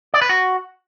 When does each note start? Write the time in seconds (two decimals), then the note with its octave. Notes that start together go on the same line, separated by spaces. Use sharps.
0.14 D5
0.22 B4
0.29 F#4